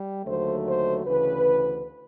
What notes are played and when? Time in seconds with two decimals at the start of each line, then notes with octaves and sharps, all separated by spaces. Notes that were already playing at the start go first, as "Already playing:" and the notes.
Already playing: G3
0.25 D#2 D3 F#3 A3 C5
0.66 C5
1.05 D2 C#3 E3 B4